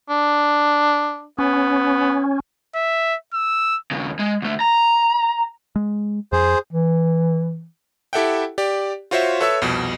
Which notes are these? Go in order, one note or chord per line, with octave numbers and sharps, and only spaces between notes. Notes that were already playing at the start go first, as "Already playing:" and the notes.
D4
B3 C#4
E5
E6
D#2 C#3
G#3
D2 A3
A#5
G#3
F2 G#4 C5
E3
E4 G4 A4 E5 F#5 G5
G4 D5
F4 F#4 C5 C#5 E5
A4 B4 C#5 E5 E6
C2 F2 B2